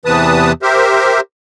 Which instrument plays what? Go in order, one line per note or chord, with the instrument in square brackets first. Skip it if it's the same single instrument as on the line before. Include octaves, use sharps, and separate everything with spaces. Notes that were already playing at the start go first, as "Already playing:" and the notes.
[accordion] E2 C3 E3 B4 A5 D#6
G4 A#4 C5 E5